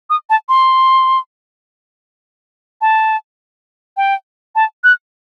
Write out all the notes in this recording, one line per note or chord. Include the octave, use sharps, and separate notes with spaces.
D#6
A5
C6
A5
G5
A5
F#6